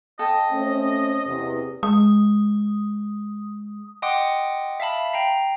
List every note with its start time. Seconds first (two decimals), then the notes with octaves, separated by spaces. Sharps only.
0.19 A4 D#5 G5 A5
0.51 A3 C4 C#4
1.26 E2 C3 D#5
1.83 G#3 D#6
4.02 D#5 F#5 G5 C6 D6 D#6
4.80 E5 F5 A5 B5
5.13 G5 A#5 C7